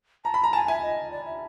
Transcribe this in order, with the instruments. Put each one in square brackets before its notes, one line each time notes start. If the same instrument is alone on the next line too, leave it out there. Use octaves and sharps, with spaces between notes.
[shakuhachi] A5 [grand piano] A#5
[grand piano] B5
A#5
[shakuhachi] G#5 [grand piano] A5
[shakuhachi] E5 [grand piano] G#5
[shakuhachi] D#5
D5
E5